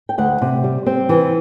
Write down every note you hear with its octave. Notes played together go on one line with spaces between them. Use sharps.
G5
D2 F#5
C3
G3
C4
E3